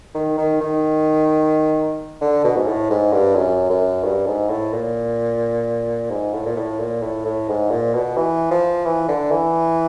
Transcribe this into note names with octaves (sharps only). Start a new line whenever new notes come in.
D#3
D#3
D#3
D3
B2
G#2
A2
G#2
G2
F#2
F#2
G2
G#2
A2
A#2
G#2
A2
A#2
A2
A#2
A2
A2
G#2
A#2
B2
E3
F3
E3
D3
E3